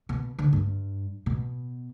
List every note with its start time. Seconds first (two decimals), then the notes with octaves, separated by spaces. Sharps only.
0.09 B2
0.39 D3
0.53 G2
1.26 B2